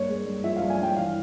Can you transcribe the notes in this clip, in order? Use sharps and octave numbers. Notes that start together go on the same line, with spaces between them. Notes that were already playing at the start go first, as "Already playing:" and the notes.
Already playing: G2 A#3 C#5
G#3
G2
F3 E5
G2 F5
G#5
G2 G5
E3 F5